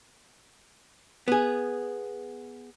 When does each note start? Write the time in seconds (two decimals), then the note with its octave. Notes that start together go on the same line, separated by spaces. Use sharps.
1.28 B3 G#4